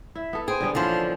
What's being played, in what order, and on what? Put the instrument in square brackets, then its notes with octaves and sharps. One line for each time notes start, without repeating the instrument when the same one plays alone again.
[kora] E4 [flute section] E5
[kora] B3 A4
[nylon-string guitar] G#4 [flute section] C5 G5 G#5
[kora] D3 G3 B3
[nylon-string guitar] D3 F3 [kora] E3 A#3 C#4 [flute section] A5 C6